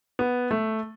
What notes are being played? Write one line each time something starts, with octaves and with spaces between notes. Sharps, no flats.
B3
A3